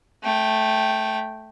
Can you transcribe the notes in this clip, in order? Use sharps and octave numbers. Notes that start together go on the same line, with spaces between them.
A3 G5